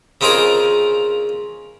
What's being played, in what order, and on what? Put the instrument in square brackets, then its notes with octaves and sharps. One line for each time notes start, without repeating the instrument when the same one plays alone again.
[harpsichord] C#3 C4 D#4 F4 G#4 A#4